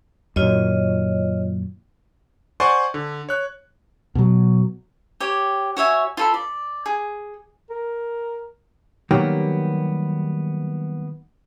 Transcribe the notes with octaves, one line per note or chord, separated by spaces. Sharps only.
F#2 A#2 D#3 F4 C#5 D#5
C5 D5 F#5 G#5 C6 C#6
D3
C#5 F#6
B2 F#3
G4 C#5
F#4 C#5 E5 G#5
F4 A4 B5
D5
G#4
A#4
D#3 F#3 G3 A#3 B3 G4